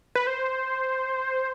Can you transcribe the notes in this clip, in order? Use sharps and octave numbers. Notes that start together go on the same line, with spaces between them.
B4
C5